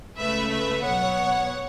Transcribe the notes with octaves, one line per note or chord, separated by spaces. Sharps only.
C#2 C#3 A3 B4 E5
B4 E5
B2 F#3 B3 C#5 F#5